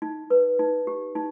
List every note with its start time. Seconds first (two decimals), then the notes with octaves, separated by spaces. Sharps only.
0.02 D#4
0.30 B4
0.59 D#4
0.87 G4
1.15 D#4